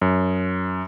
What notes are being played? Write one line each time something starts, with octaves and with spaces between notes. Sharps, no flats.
F#2